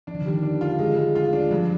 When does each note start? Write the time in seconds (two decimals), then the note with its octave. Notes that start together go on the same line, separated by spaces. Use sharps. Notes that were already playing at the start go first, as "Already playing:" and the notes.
0.07 F3 D4
0.15 D#3
0.22 D3
0.25 D#3 G3
0.43 D4
0.61 F4
0.79 D3 G#3
0.97 G#3
1.15 F4
1.33 D4
1.51 G2 F3